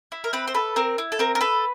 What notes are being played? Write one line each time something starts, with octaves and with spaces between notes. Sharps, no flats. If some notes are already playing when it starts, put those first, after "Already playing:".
E4
A#4
C4 B4
C5
A4 B4
C4 A#4
E4
A4
C4 A#4
A#4
A4 B4